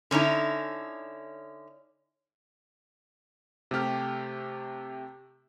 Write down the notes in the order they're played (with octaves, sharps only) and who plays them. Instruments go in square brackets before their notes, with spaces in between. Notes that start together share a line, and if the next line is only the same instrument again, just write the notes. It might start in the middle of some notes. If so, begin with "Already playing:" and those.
[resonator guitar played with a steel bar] D3 C#4 D#4 E4
[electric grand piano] C3 A3 G4 F6